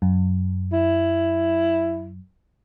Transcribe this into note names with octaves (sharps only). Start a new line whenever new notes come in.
F#2
E4